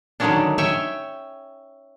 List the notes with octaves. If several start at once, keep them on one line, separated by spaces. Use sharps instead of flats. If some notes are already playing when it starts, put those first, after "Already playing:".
D3 D#3 F#3 G#3 C#4 D4
C#5 E5 G5 G#5